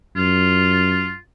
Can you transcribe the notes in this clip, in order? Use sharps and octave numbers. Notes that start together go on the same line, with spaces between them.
F#2 F4